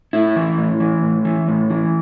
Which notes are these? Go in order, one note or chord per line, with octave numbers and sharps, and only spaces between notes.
A2 E4
E3
A2
E3
A2
E3
A2
E3